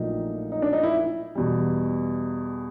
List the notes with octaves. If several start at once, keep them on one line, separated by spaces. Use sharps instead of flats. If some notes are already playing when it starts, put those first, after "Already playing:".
Already playing: A#1 A#2 F#3 A3 D#4
D#4
D4
D#4
E4
E2 B2 G3